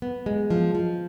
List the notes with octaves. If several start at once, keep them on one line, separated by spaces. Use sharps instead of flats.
B3
G#3
F3
F3